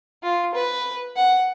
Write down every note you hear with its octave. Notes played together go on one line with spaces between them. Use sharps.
F4
B4
F#5